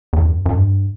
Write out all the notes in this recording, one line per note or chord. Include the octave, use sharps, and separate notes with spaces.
E2
F#2
F#2
G2